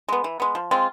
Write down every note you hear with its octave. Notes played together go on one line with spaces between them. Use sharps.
G#3 B3
E3
G#3 B3
F3
G#3 C4 F4